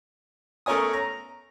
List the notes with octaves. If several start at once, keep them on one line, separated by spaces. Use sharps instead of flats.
A3 C#4 A#4 C#5 G#5 D#6
A#5